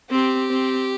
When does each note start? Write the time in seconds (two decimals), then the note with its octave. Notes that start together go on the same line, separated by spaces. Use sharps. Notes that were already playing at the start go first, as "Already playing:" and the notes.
0.11 C4 G4
0.50 C4